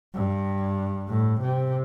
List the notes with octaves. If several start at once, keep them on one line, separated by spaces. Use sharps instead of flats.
G2
A2
C3